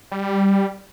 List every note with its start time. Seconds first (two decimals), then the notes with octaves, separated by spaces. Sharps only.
0.12 G3